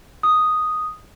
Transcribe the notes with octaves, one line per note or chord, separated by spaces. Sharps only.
D#6